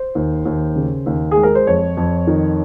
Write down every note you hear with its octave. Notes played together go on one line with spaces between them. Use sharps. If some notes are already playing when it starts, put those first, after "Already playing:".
Already playing: C5
D#2
D#2
C#3
D#2
G#4
G#3
A#4
C5
F2 C#5
F2
D#3